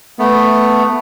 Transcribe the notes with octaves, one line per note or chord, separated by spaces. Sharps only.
A3 B3